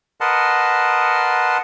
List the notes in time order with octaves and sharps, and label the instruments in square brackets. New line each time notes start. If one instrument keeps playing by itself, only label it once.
[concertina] A#4 B4 D#5 F#5 A5 C6